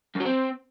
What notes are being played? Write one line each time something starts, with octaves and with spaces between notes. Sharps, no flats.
F#2
F#3
C4